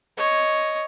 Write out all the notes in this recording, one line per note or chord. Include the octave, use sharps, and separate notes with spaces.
C#5 D#5